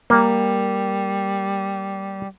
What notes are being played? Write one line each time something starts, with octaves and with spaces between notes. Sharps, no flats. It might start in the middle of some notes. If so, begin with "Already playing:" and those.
G3 A#3